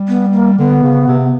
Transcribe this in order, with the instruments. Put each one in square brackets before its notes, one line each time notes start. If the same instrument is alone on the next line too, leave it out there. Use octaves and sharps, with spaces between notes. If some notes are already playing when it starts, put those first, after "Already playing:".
Already playing: [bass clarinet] G3
[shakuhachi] B3
A#3
[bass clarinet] D3 [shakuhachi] B3
[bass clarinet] C#3
C3